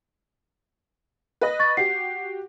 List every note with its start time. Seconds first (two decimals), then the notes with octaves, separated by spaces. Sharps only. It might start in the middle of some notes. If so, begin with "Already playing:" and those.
1.41 B4 D#5
1.60 C#6 A6
1.77 F#4 G4 C7